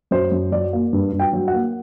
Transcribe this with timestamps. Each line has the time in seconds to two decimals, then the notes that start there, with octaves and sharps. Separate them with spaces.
0.11 F#2 C5
0.32 F#2
0.52 F#3 D5
0.73 A#3
0.93 G2
1.13 G2
1.19 G5
1.33 F#3
1.48 F#5
1.54 A#3